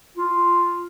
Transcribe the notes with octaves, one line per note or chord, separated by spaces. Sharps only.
F4